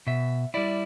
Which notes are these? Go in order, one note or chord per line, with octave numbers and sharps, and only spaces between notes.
B2 E5
G3 E4 D5